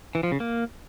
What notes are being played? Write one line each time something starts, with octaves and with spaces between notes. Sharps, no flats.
E3
F3
C#3
A#3